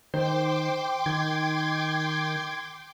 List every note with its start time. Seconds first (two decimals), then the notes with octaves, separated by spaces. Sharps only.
0.14 D#3 C5 G5 C6 D6
1.06 D#3 G#6